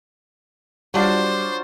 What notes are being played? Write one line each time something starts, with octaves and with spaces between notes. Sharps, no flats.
F#3 G3 D4 F4 C5